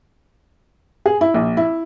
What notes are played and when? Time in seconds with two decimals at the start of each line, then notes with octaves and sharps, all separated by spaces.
1.06 G#4
1.21 E4
1.34 A#1
1.57 E4